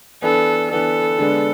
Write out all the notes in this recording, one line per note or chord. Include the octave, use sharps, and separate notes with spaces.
E3 B3 D4 A4
E3 B3 D4 A4
D3 G#3 B3 D4